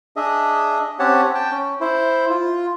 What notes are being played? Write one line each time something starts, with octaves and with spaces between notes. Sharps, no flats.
D4 G#4 D#5 E5
C4 C#4 G4 C#5 F#5 A5
G5 A5
C#4
E4 C5
F4